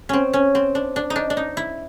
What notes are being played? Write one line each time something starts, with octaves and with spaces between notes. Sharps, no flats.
C4 C#4
C#4
C4
D4
D4
D#4
D4
D4
D#4
E4